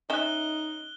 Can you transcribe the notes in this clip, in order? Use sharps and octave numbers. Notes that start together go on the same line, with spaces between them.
C#4 D#4 E5 F#6 G7